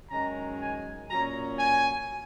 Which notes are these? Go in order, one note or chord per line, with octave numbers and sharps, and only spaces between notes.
F#2 D#3 G#3 C#4 A#5
G#5
A#2 F#3 C#4 A#5
G#5